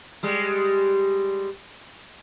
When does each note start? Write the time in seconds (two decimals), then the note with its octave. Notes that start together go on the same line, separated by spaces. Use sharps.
0.23 G3 G#3